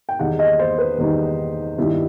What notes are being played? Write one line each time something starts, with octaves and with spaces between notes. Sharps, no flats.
G5
E2 D#3 G3 D#4 F#5
D#5
C5
B4
E2 D#3 G3 D#4
G2 D#3 G3 B3 E4